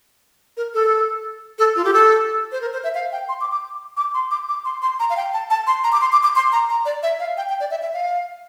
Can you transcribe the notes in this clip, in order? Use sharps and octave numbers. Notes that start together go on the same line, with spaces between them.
A#4
A4
A4
F4
G4
A4
C5
A#4
C5
E5
F5
G5
C6
D6
D6
D6
C6
D6
D6
C6
C6
A#5
F5
G5
A5
A5
C6
A#5
D6
C6
D6
D6
C6
A#5
A#5
D5
E5
F5
G5
G5
D5
E5
E5
F5